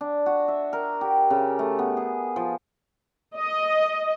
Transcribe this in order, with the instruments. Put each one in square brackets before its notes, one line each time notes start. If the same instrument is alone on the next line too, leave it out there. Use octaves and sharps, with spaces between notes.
[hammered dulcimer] D4
F#4
E5
A#4
G4
C#3
A3
B3
G#4
F3
[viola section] D#5